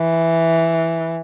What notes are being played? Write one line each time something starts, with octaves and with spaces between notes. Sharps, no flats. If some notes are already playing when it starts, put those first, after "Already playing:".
Already playing: E3